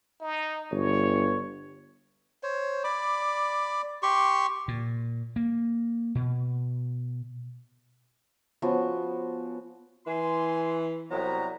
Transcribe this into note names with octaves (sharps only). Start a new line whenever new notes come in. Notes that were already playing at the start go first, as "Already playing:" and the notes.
D#4
G1 C#5
C5 C#5
D5 B5 D6
G4 C6 C#6
A#2
A#3
B2
F3 B3 C#4 F#4
E3 G#5 C6
C2 F#3 B3 A#5